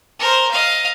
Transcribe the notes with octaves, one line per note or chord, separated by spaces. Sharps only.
A#4 C5
D#5 F5